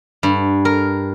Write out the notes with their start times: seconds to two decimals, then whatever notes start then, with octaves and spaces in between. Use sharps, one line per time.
0.23 G2
0.65 A#4